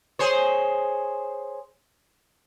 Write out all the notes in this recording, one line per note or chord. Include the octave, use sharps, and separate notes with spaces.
G#4 C5 C#5